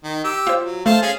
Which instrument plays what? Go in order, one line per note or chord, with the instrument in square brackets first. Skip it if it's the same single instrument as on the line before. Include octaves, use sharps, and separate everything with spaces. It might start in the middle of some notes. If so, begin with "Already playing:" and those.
[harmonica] D#3
G4 E6
[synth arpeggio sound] F4 C5
[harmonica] F#3
[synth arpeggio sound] A3 [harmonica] C5 F5 A5
[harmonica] C#4 G#4 F5